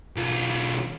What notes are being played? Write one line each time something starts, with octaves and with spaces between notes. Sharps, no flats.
B1 F4